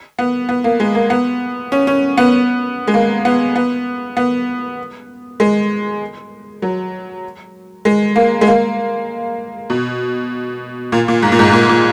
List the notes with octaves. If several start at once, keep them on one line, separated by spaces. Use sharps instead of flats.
B3
B3
A#3
G#3
A#3
B3
C#4
C#4
B3
G#3
A#3
B3
B3
B3
G#3
F#3
G#3
A#3
G#3
A#3
B2
A#2
A#2
G#2
A#2
G#2
G#2
A#2
A#2